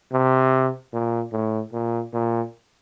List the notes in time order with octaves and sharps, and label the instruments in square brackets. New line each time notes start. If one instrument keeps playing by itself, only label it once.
[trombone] C3
A#2
A2
A#2
A#2